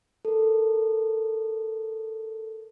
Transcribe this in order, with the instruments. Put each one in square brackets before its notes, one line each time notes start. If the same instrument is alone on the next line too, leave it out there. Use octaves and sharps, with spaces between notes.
[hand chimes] A4 A#4